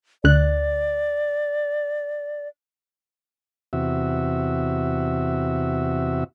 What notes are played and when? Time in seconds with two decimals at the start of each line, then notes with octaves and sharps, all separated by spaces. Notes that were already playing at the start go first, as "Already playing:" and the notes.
0.24 D2 D5 F#6
3.73 E2 C3 F#4 E5